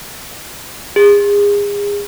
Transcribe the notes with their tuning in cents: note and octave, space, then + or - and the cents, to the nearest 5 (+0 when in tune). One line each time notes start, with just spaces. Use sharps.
G#4 -35